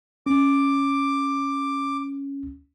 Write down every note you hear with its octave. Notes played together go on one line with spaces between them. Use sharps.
C#4 D6